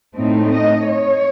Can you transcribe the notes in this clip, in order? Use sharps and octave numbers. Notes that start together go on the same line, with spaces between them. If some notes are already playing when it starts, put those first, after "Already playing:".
A2 A3 C4 D#4
D#5
C#5